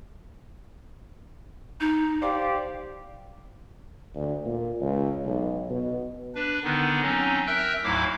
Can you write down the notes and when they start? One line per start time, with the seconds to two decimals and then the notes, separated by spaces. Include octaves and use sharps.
1.80 D#4
2.21 G4 C5 D5 F5
4.15 D2
4.46 A#2
4.81 C#2
5.25 B1
5.70 B2
6.35 D4 B4
6.64 D3 D#3 B3 D4 D#4
7.02 F#3 C4 C#4 D#4
7.47 A#4 E5 G5 E6 F#6 G6
7.84 D2 G#2 F#3 E4 F5 D6